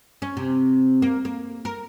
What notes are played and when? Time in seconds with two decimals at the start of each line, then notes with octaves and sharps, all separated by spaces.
0.22 C#4
0.37 C3
1.02 A#3
1.25 A#3
1.65 A#4